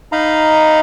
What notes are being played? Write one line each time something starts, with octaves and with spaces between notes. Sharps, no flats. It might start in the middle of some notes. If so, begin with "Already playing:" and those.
D#4 D#5 F5 A#5 B5